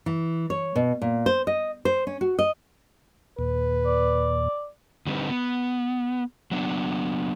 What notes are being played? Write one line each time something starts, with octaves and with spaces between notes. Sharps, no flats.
E3
C#5
B2
A#2
C5
D#5
C5
C#4
F#4
D#5
D#2 A#2 B4
D5
D3 G3 C4 D#4 B4
B3
F#3 B3 D4